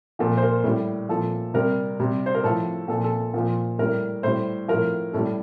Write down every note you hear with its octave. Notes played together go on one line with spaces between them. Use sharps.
A#2 F3 A4
C5
A#4
A2 G3
A#2 F3 A4
C3 G3 A#4
C3 G3
C5
A#4
A2 F3 A4
A#2 F3 A4
A4
A#2 F3
A2 G3 A#4
A2 G3 C5
A2 F3 A#4
A2 G3 A4